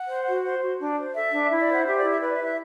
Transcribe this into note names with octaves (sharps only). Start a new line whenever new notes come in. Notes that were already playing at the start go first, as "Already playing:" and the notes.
Already playing: F#5
C5
F#4
C5
F#4
D4
C5
A4 E5
D4
E4
D5
C5
F#5
G4 E5
D5
E4
E5
B4 D5
E5
E4
E5